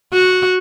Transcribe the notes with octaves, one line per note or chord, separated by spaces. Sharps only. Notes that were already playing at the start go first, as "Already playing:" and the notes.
F#4